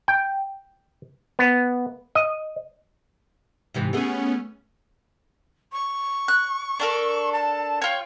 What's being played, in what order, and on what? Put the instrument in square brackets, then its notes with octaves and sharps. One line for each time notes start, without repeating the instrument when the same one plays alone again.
[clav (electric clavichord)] G5
B3
D#5
[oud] G#2 C3 E3
[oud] A3 G#4 [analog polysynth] B3 C#4
[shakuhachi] C#6
[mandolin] F#6
D4 A4 A#4
[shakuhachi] A5
[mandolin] F4 C#5 [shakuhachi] G5